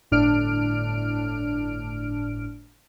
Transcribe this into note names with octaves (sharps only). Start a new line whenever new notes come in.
G1 A2 D4 F6 D7